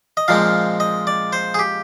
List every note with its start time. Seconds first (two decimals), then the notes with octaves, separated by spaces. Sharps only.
0.17 D#5
0.28 A#2 F3 G#3 C4 F5
0.80 D#5
1.07 D5
1.33 C5
1.54 G#4
1.59 G4